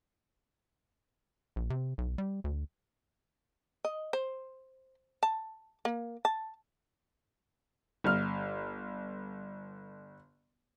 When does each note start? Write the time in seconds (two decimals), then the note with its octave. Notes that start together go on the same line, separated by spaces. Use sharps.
1.56 A#1
1.70 C3
1.98 B1
2.18 G3
2.44 D2
3.85 D#5
4.13 C5
5.23 A5
5.85 A#3
6.25 A5
8.04 G1 F6